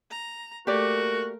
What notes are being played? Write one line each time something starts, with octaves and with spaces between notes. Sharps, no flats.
A#5
A3 A#3 F#4 G4 A#4 D5